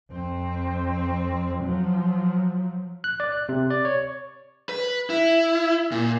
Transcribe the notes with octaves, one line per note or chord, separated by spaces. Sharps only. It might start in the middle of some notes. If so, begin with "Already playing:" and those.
F2 C4
F3 F#3
F#6
D5
F#6
C3
D5
C#5
B4
E4
A#2